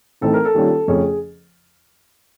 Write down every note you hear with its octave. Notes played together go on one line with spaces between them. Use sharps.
A2 E3 A3 C4 D#4 A4
A#4
A4
D#3 G3 A#3 C#4 F4
F2 C#3 F3 A3 C#4 G#4